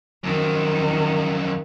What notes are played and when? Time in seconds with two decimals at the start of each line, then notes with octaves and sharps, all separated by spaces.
0.24 F#2 D#3 F3